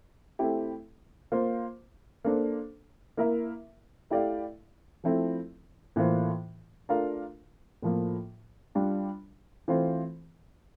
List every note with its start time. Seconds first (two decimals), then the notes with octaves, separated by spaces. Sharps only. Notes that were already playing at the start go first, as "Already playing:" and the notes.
0.39 A3 C4 E4 G4
1.32 A#3 F4 C5
2.25 A#3 D4 A4 C5
3.17 A#3 E4 A#4 E5
4.10 A3 E4 G4 D5 F5
5.04 F3 A3 C4 E4
5.96 A2 E3 A#3 F4 C5
6.89 A3 D4 F4 A#4 F5
7.82 A2 F3 A#3
8.75 G3 D4 F4
9.68 E3 A3 C4 F4 C5